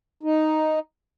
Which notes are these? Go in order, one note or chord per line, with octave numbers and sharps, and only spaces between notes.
D#4